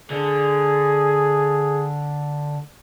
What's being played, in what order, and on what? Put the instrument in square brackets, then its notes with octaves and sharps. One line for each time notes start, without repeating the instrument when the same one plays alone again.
[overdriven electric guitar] D3 [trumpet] G#4